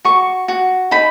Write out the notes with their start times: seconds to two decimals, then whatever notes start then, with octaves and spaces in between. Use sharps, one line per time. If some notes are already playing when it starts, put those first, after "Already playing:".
0.05 F#4 C#6
0.48 F#4
0.91 D#4 B5